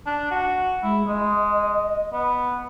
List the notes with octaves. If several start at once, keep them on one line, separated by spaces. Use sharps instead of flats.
D4
F#4
G#3 E4
G#3 D#5
B3